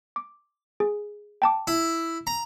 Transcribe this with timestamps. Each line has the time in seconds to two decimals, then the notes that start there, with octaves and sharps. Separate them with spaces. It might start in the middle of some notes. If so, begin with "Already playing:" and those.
0.16 D6
0.80 G#4
1.42 G5 A5 D6
1.67 E4
2.27 A#5